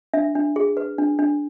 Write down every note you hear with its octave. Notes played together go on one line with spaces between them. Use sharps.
D4 E5
D4
G#4
B4
D4
D4